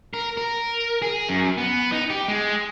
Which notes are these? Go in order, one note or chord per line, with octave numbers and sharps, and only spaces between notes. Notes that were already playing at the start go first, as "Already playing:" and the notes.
A#4
A#4
G#4
F#2
B3
D#4
G4
G#3